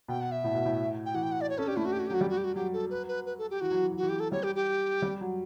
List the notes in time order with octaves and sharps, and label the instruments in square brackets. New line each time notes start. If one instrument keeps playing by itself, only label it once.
[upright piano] B2 [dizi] G5
[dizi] F#5
E5
[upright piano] A2
B2
A2
[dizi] G5
[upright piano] E3 [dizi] F#5
[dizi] G5
F#5
D5
C#5
[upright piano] C#4 [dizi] A4
[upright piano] D4 [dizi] G4
[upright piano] A3 [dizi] E4
[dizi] F#4
G4
F#4
G4
[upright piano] F#3 [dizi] F#4
[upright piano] G3 [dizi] G4
[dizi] F#4
G4
F#4
[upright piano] F#3 [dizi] G4
[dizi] A4
B4
B4
B4
A4
G4
[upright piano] E3 [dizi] F#4
[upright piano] F#3
E3
F#3
[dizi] F#4
[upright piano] E3
[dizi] G4
A4
[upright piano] G3 [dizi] C#5
[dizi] G4
G4
[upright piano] G3
F#3